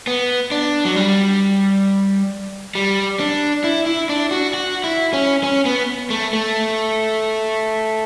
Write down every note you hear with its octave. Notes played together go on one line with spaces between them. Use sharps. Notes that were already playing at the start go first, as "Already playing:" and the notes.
B3
D4
F#3
G3
G3
D4
E4
E4
D4
F#4
F#4
E4
C#4
C#4
B3
A3
A3